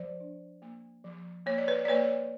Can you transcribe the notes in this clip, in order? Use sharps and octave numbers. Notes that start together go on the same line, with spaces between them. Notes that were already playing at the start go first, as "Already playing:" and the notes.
Already playing: F3 C5 D5
D4
A#3
F3
A#3 C#5
D5
B4 C#5
D5
A#3 B4 C#5